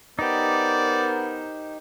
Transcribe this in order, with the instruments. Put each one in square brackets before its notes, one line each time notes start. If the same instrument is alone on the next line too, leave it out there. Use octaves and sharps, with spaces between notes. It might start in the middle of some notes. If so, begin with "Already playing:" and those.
[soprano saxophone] B3 [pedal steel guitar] D#4 G4 [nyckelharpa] A#4 C5 [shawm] D5